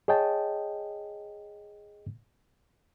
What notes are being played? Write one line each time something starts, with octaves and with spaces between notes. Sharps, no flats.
G#4 C#5 D#5 G5 A5